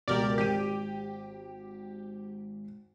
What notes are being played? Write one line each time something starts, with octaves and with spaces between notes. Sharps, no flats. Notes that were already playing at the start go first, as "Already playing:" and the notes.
C#2 B2 G4 A#4 D5
G#1 G4 D#7